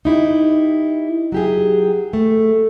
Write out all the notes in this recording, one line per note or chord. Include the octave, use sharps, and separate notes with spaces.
D#4 E4 G4
F#3 G4 G#4
A3